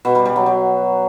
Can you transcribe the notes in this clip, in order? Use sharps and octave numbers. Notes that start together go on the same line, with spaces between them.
B2
G3
G3
F#3
F#3